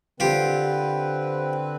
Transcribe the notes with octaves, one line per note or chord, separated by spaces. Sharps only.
D3 C4 F4 G4 B4